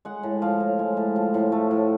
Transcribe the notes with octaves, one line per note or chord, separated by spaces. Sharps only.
G#3 F#5
A2
F3 F5
A2
G#3
A2
F3
A2
A3
A2